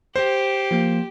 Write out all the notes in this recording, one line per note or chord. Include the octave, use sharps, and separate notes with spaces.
G4 C5
F3 A#3